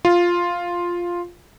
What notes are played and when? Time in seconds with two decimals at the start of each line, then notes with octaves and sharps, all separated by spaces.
0.05 F4